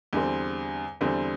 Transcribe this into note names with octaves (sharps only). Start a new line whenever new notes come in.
E2 D3 G3 C4
E2 D3 G3 C4